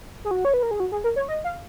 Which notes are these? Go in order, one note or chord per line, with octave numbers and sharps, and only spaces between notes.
G#4
F#4
C#5
B4
A#4
G#4
F#4
G#4
A#4
C#5
D#5
F5